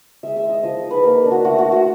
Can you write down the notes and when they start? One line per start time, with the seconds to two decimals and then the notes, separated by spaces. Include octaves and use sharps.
0.23 G#3 E5
0.36 E5
0.43 G#3
0.49 D#5
0.63 F3 D#5
0.83 D#4
0.91 B4
1.04 A#3 A#4
1.25 D4
1.31 F#4
1.45 A3 F#4
1.58 F#4
1.65 A3
1.72 F#4